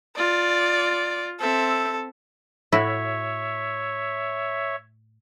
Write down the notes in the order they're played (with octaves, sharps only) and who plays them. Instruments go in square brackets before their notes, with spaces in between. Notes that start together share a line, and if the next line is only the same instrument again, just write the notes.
[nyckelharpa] F4 [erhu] D5
[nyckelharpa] C4 E5 [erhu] A4
[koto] A2 E4 F#4 [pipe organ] C#5 E5